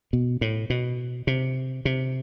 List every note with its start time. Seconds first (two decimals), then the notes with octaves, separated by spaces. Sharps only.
0.13 B2
0.41 A2
0.70 B2
1.27 C3
1.85 C3